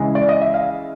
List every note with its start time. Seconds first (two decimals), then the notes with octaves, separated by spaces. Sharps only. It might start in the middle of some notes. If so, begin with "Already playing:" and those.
Already playing: C#3 E3 G#3 C#4
0.15 D5
0.29 D#5
0.41 E5
0.54 F5